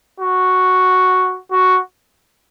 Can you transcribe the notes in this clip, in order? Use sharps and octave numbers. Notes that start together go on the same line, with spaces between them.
F#4
F#4